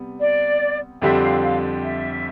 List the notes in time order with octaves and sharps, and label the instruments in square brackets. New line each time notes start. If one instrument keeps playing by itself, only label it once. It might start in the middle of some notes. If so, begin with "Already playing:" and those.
Already playing: [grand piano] C3 G3 B3
[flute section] D5
[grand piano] F2 D3 G3 C4 G4 [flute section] E5
[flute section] F5
F5
E5